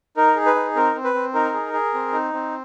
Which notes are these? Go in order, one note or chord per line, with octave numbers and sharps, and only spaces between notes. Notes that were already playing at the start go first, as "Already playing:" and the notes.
D#4 A#4
G#4
B4
D#4
C4 A#4
C4
B4
C4
D#4 A#4
G#4
G#4
C4
D#4
C4